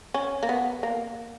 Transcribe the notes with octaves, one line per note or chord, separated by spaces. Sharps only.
C#4
A#3
B3
A#3